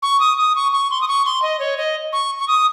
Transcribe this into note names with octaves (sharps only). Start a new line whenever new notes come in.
C#6
D#6
D#6
C#6
C#6
C6
D#6
C#6
C6
D#5
C#5
D#5
C#6
C#6
D#6